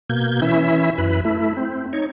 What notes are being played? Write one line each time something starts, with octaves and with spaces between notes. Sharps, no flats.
B2 A#3 G6 G#6
E3 C#4 E4 E5
F#2 E4 B4
A3 E4
C4
D#4 C#5